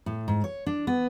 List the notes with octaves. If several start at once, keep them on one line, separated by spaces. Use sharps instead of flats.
A2
G#2
C#5
D4
B3